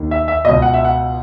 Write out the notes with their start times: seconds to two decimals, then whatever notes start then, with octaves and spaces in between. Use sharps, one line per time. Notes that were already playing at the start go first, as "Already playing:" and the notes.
Already playing: D#2 D#3
0.11 E5
0.28 E5
0.45 C#2 B2 D#5
0.62 F#5
0.74 E5
0.85 F#5